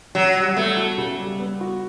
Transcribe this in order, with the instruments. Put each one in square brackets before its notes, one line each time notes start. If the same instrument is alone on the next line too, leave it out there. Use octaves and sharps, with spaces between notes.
[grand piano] C#3 [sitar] F#3
[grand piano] G3
[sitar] A3 [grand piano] B3
[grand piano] F#4
C#3
G3
B3
F#4